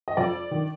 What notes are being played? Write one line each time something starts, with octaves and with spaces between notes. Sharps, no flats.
D#5
F2 D5
D#3